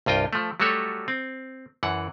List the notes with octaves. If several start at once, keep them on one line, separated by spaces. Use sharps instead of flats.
C2 G2 F4 D#5 G5
F3 A3
F#3 G3 A3 F#4 A4 C#5
C4
F#2 E3 F#5